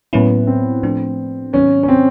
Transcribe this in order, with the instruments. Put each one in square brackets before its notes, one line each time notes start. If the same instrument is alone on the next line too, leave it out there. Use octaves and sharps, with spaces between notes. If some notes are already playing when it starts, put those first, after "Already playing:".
[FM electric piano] A2 F#3 A#3 C#4 E4 [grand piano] B3
[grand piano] C4
[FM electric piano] A2 F3 A3 D4
[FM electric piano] G#2 D#3 F#3 B3 [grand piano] C#4
[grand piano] C#4
C4